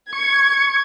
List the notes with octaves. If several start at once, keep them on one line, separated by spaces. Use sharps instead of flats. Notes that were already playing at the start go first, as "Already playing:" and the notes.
C#6 G#6